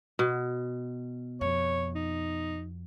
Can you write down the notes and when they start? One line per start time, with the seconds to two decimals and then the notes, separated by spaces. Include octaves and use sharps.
0.19 B2
1.41 F2 C#5
1.95 D#4